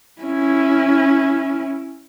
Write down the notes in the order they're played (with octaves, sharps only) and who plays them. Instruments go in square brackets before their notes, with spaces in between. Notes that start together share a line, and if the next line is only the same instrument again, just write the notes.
[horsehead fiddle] C#4 E4